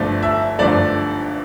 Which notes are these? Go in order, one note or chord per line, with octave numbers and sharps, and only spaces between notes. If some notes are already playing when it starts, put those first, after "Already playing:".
Already playing: G1 G2 D3 F3 A3 D5
E5
G1 G2 D3 F3 A3 D5